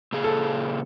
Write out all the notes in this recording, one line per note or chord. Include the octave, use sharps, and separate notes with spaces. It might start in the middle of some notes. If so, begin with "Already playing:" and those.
A#2 C#3 G#4
A4